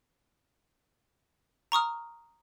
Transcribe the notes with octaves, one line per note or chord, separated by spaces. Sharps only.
A#5 C#6 D#6 F6